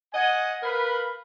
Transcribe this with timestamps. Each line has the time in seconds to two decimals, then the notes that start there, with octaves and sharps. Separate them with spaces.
0.14 D#5 F#5 G#5
0.62 A#4 B4 F5 B5